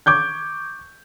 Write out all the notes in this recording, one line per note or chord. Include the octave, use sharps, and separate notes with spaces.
C#6 D6 G6 G#6